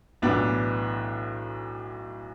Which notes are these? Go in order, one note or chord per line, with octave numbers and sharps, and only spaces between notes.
B1 A2 E3 B3 D4